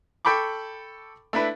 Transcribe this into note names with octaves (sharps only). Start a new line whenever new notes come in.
A4 G5 B5 C#6 D6
A3 D4 E4 B4